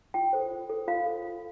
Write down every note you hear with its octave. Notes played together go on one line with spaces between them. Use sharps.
F4 G5
A4 C5
F4
A4 C5
F4 F5
A4 C5
F4